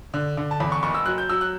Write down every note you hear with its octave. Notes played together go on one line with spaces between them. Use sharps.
D3
D3
A5
E2 B5
C#6
F#1 C#6
E6
F#3 F#6
G6
F#3 E6
F#6